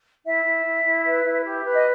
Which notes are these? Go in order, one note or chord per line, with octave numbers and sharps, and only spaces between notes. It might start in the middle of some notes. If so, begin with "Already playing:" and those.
E4 E5
E4
E4
E4
B4
E4
G4
B4
D#5